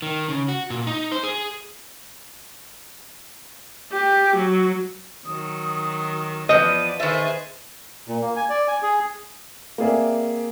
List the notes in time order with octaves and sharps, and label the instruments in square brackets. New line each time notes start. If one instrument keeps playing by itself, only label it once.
[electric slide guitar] D#3
C#3
F#4
A#2
D#4
C5
G#4
[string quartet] G4
F#3
[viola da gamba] D#3 F#3 [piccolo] D#6
[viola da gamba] E2 D5 [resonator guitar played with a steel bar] F3 B3 [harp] D#5 [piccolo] D#7
[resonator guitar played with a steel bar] D#3 E5 [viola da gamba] G#4 B4 C5 [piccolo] A6
[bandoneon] A#2
A#3
G#5
D5
G#5
G#4
[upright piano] A#3 C4 G#4 D5 E5